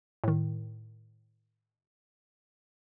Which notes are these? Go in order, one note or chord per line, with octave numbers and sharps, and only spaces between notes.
A2 D#3